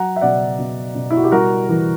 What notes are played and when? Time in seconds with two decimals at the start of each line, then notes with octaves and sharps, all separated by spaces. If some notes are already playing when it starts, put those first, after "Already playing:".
Already playing: F#3 F#5 A#5
0.16 E5
0.21 B2 D5 F#5
0.58 B2
0.95 B2
1.11 E4
1.17 F#4
1.24 G4
1.31 G3 F#4 A#4
1.69 E3